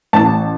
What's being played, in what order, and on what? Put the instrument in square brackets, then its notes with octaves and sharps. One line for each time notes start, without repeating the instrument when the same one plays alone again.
[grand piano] A1 A5